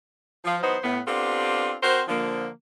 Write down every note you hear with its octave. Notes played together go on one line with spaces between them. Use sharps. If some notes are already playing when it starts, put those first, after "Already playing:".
F3
E3 F#3 B3 D#4 C5
A2 B3
B3 C4 D4 F4 G4 A4
C4 F#4 A#4 C5
D3 F3 A#3